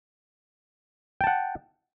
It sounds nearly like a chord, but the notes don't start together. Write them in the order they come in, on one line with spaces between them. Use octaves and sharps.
G5 A5 F#5